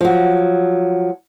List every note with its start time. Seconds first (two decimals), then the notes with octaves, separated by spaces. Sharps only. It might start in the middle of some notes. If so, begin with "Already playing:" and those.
0.01 F3 F#3